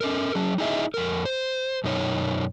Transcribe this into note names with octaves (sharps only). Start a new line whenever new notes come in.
C#4 A4 A#4
F#3 C#4 G#4
D#4 E4 G#4 D#5 E5
F2 A#4
C5
F#2 B2 D#4 C#5